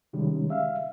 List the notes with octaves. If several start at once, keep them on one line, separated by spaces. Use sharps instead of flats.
C3 D#3 G3 G#3 C#4
E5 F5